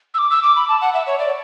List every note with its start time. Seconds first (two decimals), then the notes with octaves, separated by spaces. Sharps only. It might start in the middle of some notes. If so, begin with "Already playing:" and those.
0.14 E6
0.18 D6
0.31 E6
0.43 D6
0.56 B5
0.69 A5
0.81 F#5
0.94 E5
1.07 C#5
1.19 D5